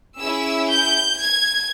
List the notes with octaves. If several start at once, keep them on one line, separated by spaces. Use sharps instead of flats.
C#4 E4 G#4 E6
G6
G#6